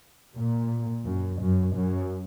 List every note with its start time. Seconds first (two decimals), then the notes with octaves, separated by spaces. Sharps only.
0.35 A#2
1.05 F#2
1.39 F#2
1.75 F#2